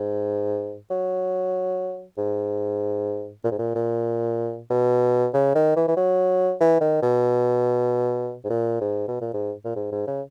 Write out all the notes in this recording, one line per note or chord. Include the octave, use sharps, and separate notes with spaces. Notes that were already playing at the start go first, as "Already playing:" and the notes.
Already playing: G#2
F#3
G#2
A#2
G#2
A#2
A#2
B2
C#3
D#3
E3
E3
F#3
E3
D#3
B2
G#2
A#2
G#2
B2
A#2
G#2
A#2
G#2
G#2
C#3